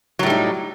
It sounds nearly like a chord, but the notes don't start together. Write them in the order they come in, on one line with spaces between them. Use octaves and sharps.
F#3 A2 G3 D#4